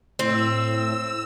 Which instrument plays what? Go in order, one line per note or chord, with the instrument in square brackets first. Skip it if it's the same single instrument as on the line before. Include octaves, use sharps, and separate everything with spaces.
[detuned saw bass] A2 [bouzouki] C4 [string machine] E6